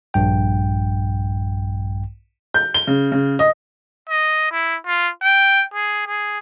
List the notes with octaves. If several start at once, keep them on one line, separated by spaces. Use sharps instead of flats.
A#1 G2 G5
G6
G7
C#3
C#3
D#5
D#5
E4
F4
G5
G#4
G#4